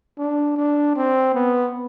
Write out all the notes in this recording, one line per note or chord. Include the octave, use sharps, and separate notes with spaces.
D4
D4
C4
B3